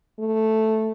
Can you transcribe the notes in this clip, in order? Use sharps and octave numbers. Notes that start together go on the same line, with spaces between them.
A3